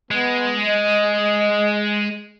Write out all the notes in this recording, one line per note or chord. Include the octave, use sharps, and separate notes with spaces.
G#3 B3
D#5